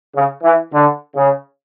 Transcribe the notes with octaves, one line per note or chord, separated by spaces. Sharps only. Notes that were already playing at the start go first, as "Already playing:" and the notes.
C#3
E3
D3
C#3